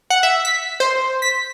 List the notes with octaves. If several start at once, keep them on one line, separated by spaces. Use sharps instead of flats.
F#5
E5
B6
C5
B6